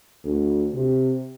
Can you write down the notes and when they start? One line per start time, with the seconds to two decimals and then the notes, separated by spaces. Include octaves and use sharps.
0.24 D2
0.73 C3